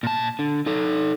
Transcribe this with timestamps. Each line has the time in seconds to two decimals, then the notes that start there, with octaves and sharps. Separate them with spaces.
0.03 A#2 A5
0.39 D3
0.66 D#4 A4